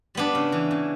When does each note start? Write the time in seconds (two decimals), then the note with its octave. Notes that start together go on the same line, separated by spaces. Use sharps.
0.15 G3 B3 D4
0.35 C#3
0.52 E3
0.71 C#3